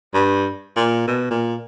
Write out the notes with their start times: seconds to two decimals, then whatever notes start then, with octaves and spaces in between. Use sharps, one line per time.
0.14 G2
0.76 A#2
1.07 B2
1.31 A#2